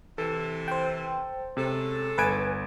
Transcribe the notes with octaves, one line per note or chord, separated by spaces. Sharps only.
C3 E3 A4
C5 G5
C3 G#3 C#4 A4
G1 B4 G#5 D7